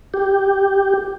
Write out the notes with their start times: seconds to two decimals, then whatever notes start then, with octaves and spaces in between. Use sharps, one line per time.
0.14 G4